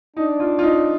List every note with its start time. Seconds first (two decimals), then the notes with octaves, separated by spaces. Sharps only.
0.17 D4 D#4
0.40 F4
0.59 F4
0.63 D#4